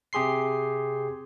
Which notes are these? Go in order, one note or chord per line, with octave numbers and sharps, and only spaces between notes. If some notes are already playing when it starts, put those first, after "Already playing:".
C3 G4 G#4 C6 C7